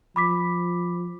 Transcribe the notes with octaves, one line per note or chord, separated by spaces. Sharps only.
F3 B5 D6 B6